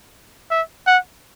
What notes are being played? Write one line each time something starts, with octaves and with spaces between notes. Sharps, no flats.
E5
F#5